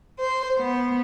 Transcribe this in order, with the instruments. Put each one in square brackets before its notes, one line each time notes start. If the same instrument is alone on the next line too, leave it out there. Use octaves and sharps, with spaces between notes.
[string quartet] C5
B3